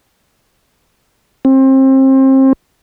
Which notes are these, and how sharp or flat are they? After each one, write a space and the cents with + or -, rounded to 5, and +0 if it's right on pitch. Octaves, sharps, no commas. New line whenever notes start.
C4 +30